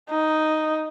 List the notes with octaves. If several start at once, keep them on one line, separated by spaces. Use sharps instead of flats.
D#4